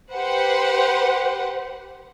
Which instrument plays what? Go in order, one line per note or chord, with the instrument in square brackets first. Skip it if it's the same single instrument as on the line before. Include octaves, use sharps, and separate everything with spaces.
[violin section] G4 B4 C5 F#5